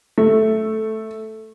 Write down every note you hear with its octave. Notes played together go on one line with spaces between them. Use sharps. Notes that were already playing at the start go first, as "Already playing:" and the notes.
A3